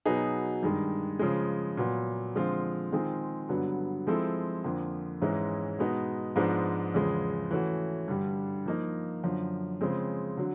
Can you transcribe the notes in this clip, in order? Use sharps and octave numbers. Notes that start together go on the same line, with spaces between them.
B2 F#3 B3 D#4 G#4
G2 D#3 G#3
C#3 F3 G#3
A#2 F#3 B3
D3 F3 G#3 C4 F4
D#3 G#3 C4 F4 G#4
G2 D3 F#3 B3
F3 G#3 C4 E4 A4
F2 D3 F3 A#3
G#2 E3 G#3 C#4 E4
B2 G#3 B3 D#4
G#2 F3 G#3 B3 D4
E2 C#3 F3 G#3
E3 A3 C#4 F#4
G2 D3 G3
F3 A#3 D#4
F#2 D3 F3
C#3 F3 G#3 C4
D3 F#3